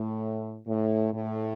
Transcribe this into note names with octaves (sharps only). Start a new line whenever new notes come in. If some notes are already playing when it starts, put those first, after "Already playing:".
Already playing: A2
A2
A2